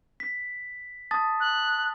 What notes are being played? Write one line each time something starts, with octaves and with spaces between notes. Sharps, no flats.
B6
A5 D#6 A6
F#6